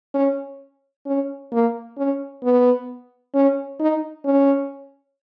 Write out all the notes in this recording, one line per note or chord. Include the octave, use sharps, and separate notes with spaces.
C#4
C#4
A#3
C#4
B3
C#4
D#4
C#4